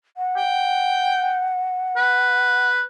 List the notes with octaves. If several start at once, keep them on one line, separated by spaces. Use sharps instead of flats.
F#5
G5
B4